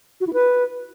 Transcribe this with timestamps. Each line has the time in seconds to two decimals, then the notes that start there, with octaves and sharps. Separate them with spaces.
0.21 F#4
0.27 E4
0.33 B4